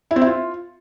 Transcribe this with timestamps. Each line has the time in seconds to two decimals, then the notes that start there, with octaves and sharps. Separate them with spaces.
0.11 E4
0.16 C4
0.21 E4
0.27 F4